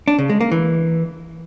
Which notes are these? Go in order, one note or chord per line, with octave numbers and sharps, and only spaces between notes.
D4
C#3
G#3
A#3
E3